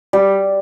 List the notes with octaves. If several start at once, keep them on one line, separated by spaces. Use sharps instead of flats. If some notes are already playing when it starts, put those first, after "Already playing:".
G3